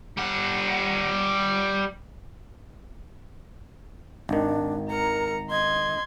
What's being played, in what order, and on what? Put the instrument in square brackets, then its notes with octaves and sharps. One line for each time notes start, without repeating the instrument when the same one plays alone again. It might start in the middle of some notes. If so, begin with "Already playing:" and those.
[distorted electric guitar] G3 F#5
[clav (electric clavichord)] G#1 D#3 [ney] D4
[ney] A#4 [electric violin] A#5 C#7
[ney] D#5 [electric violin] C6 G#6